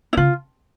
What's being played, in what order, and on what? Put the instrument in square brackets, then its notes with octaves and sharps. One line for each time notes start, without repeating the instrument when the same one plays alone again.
[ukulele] E4
[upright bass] C#3 [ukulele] F4